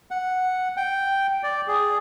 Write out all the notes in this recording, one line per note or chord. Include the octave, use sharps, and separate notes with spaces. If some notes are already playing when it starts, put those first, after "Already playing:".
F#5
G5
D5
G#4